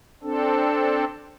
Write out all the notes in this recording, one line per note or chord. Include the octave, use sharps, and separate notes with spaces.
C4 D4 A4